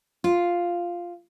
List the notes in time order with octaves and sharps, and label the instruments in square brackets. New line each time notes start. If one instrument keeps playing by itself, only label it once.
[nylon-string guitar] F4